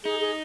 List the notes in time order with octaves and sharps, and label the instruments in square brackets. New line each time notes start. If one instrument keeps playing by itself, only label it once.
[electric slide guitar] D#4 [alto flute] G#4
[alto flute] G#4